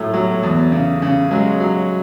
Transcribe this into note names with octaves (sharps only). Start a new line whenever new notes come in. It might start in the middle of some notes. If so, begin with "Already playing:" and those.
Already playing: A2 F#3 A3
F#3
E2
C#3
C#3
F#3 G#3
F#3